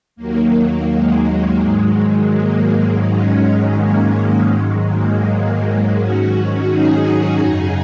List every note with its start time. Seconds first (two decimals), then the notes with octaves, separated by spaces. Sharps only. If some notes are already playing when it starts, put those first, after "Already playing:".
0.16 D#2 D#3 F#3 A#3
0.88 G#3
1.61 G#2 D#3 F#3
2.34 A#3
3.05 G#2 D#3 F#3 G#3 C#4
3.77 A#3
4.14 G#3
4.49 G#2 D#3 F#3 G#3
4.85 A#3
5.22 A#3
5.94 G#2 D#3 F#3 C#4 F#4
6.66 D#4 G#4
7.39 F#2 C#3 F#3